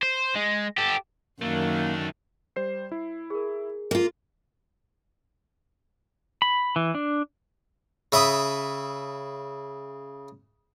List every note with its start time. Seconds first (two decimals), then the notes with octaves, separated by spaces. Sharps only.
0.03 C5
0.36 G#3
0.78 G4 A4
1.42 F#2 D#3 A3 A#3 D4
2.56 G3 C5 C7
2.92 E4
3.30 G#4 A#4
3.91 A#3 F4
6.42 B5
6.76 E3
6.95 D4
8.12 C#3 E5 B5 D#6